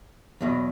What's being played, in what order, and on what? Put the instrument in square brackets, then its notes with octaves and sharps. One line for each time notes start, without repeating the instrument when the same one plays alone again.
[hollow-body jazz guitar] E2 B2 F#3